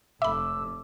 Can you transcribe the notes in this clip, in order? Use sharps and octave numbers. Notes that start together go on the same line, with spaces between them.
F1 A3 E5 B5 D6 E6